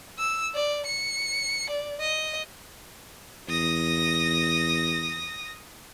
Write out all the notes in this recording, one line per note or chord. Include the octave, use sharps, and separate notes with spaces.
E6
D5
C#7
D5
D#5
E2 D#6 A#6